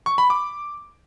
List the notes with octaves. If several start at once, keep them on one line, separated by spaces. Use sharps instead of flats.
C#6
B5
D6